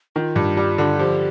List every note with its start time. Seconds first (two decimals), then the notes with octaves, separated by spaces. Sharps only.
0.16 D#3 F4
0.36 G2
0.57 G3
0.78 D3
0.98 F3 G4